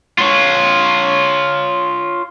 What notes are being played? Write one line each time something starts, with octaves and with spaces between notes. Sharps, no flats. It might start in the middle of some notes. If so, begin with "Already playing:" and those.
F4 C#5